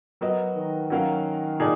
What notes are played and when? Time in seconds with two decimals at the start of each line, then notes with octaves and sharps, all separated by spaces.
0.21 F#3 B3 F#4 A#4 D#5
0.56 D#3
0.90 F#3 C#4 F#4 A#4 F5
1.60 A#2 D#4 G#4